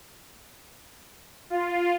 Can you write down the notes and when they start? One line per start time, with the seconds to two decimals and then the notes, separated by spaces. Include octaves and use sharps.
1.50 F4